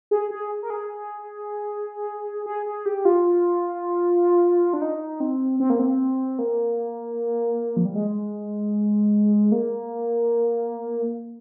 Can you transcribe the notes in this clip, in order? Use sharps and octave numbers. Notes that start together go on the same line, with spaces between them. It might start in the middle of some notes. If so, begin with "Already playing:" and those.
G#4
G#4
A#4
G#4
G#4
G#4
G4
F4
D4
D#4
C4
C4
A#3
C4
A#3
F3
G3
G#3
A#3